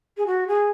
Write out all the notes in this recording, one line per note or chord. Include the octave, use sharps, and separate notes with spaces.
G#4
F#4
G#4